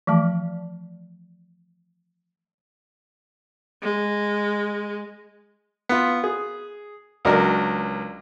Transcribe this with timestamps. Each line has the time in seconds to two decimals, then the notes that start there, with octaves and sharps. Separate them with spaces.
0.07 E3 F3 A3 A5
3.82 G#3
5.89 B3 F4
6.24 G#4
7.25 C#2 F#3 D4 A#4